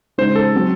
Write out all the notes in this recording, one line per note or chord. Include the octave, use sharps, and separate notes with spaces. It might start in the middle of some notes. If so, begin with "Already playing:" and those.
C#3 G#3 D#4 C5
A4
F#3 C4 F#4